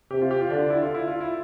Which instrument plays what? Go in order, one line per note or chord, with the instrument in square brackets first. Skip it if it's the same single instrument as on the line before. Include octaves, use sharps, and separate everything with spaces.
[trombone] C3 [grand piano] G4
[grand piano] F4
G4
F4
[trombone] D3 [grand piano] D4
[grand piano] E4
F4
E4
F4
E4